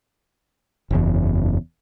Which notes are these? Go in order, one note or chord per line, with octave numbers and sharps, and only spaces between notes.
F#1 E2